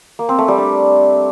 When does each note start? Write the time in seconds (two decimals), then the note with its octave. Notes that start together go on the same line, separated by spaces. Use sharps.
0.19 A#3
0.29 C4
0.39 A3
0.48 G3
0.58 D4